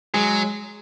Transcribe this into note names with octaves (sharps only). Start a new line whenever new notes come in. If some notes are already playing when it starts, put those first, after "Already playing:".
F#3 G#3 G#4